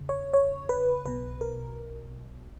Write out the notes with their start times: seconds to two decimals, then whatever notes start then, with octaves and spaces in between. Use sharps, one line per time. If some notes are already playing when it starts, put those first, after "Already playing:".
Already playing: E2 C#3
0.09 C#5
0.33 C#5
0.69 B4
1.06 B1 B2 B4
1.41 A#4